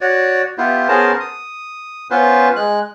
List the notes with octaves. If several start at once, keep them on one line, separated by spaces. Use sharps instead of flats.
F#4 C#5 D5
B3 E4 F4 G4
B3 C#4 G#4 A#4 C5 A5
D#6
B3 C#4 F4 B4 C5
G#3 F#6